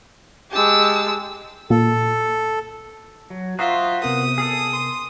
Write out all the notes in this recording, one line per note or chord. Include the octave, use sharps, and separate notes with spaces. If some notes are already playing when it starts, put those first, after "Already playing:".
G#3 G4 A5 E6
A#2 A#3 A4
F#3
F4 F#4 C5 E5 F#5 A#5 D#6
C3 B3 A#4 D#6
G#4 A4
C6